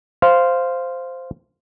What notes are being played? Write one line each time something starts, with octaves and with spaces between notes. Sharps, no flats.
C5 F5